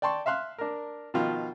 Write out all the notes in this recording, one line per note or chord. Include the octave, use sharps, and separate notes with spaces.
D5 G5 A5 C6 C#6
E5 F5 C6 F#6
D4 A#4
B2 D#3 F3 F4